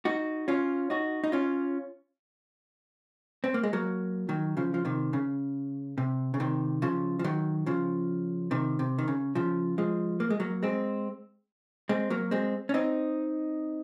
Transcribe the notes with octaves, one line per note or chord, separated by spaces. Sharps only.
D#4 F#4
C#4 F4
D#4 F#4
D#4
C#4 F4
C4
A#3
G#3
F#3 A#3
D#3 F#3
C#3 F3
F3
C3 D#3
C#3
C3
C#3
C3 D#3
C#3 F3
F3
D#3 F#3
C#3 F3
C3 D#3
C3
D#3
C#3
C#3 F3
F3 G#3
A#3
G#3
F#3 A#3
G#3 C4
G#3 C4
F#3 A#3
G#3 C4
C#4
C4 D#4